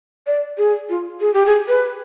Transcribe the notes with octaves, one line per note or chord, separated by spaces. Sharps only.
D5
G#4
F4
G#4
G4
G#4
B4